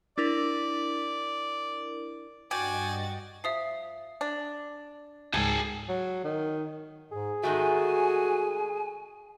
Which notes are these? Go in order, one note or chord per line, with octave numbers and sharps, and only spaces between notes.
D4 E4 A#4 D5
G2 F#4 D5 D#5 G5 G#5 A6
F3 E5 D#6 C7
D4
C#2 G#2 G#4 A5 G#6
F#3
D#3
G#2 G#4
D#3 G#3 A3 F#4 G#5